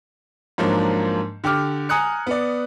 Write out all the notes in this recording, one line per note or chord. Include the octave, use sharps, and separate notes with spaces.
G#2 F3 F#3 A#3 D4
D3 G4 D6 F6
G#5 A#5 D#6 F#6 C#7
B3 D5